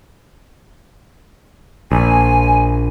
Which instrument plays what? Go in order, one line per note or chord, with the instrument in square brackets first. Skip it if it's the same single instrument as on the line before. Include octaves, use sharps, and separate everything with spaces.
[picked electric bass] A#1 [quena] G#5